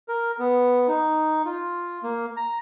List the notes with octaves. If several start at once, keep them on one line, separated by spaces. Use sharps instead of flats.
A#4
B3
D#4
F4
A#3
A#5